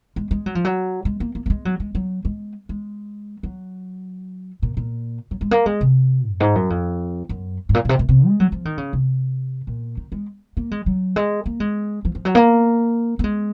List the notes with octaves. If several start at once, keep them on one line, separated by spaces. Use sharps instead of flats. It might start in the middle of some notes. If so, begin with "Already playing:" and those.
G#3
G#3
F#3
F3
F#3
G#3
A#3
A#3
A#3
G#3
F#3
G#3
F#3
G#3
G#3
F#3
A#2
A#2
F#3
G#3
A#3
G#3
C3
F#2
G#2
F#2
F2
F#2
G#2
A#2
A#2
C3
A#2
C3
G#3
F#3
F3
D#3
C#3
C3
A#2
D#3
G#3
A#3
G#3
F#3
G#3
A#3
G#3
F3
F3
F#3
A#3
A#3
G#3